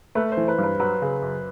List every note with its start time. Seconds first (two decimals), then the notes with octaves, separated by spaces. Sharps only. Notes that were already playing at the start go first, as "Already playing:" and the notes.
0.15 A3 B4
0.32 C5
0.37 E3
0.48 B4
0.58 G2
0.63 B4
0.80 F#3 B4
1.02 C#3
1.22 F#2